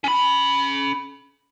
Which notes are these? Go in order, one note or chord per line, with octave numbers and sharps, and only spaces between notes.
C#4 B5